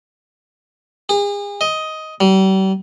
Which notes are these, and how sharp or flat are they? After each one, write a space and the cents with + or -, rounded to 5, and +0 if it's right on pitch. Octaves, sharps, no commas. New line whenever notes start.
G#4 -40
D#5 +10
G3 -40